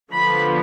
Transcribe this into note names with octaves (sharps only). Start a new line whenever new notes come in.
D3 F3 B3 D4 B5